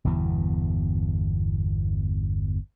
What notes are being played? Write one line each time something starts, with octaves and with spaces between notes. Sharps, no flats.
G1 E2 B2 E3